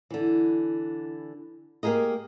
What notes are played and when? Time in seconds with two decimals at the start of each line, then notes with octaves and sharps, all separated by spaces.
0.10 D3 E3
1.83 A#3 G4 G#4 A#4 D#5